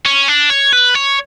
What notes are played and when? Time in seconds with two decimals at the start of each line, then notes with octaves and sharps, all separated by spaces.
0.06 C#4
0.28 D4
0.50 C#5
0.72 B4
0.95 C#5